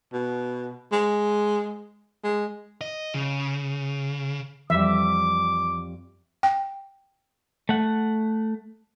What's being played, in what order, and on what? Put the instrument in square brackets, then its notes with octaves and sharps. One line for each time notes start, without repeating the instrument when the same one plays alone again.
[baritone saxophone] B2
G#3
G#3
[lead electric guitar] D#5
C#3
[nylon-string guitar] F2 G3 [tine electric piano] E3 [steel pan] E5 [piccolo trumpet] D6
[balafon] G5
[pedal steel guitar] A3 F#5